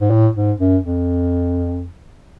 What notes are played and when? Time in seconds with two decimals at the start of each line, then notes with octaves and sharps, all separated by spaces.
0.01 G#2
0.11 A2
0.35 G#2
0.60 F#2
0.85 F2